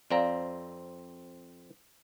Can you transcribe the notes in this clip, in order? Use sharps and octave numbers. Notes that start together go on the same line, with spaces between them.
F2 C4 D5 F5 A#5